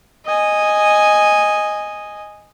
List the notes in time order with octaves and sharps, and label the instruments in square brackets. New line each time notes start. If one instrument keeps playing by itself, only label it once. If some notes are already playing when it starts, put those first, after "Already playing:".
[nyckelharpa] D#5 G#5